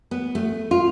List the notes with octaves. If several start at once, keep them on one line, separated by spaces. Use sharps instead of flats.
B3
A3
F4